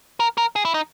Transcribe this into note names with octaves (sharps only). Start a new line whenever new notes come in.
A#4
A#4
G#4
E4
D#4